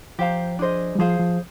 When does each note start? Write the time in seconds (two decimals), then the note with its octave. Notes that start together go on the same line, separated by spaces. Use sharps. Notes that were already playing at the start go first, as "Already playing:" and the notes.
0.19 F3 G4 C5 F5 A#5
0.59 D4 G#4 C5 D#5
0.95 G3
0.99 F3 G#4 C5 F5
1.19 F3